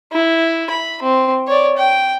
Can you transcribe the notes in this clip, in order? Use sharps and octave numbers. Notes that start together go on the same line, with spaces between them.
E4
B5
C4
C#5 D5
G5